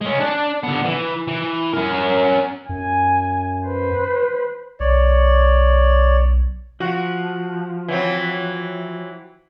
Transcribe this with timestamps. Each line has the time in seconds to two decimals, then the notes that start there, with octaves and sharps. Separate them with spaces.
0.01 G#3 C#4
0.20 D4 D5
0.63 D3 B3
0.85 E3
1.28 E3
1.74 C#4 A#4
2.69 F#2 G#5
3.66 B4 C5
4.80 B1 C#5 D5
6.80 F3 F#4
7.88 E3 F#3 C4